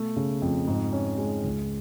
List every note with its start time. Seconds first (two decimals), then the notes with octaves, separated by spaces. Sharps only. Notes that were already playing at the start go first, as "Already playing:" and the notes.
Already playing: B2 A3
0.16 C#3
0.42 F2
0.67 G#2
0.92 C#4
1.18 G#3
1.44 C#2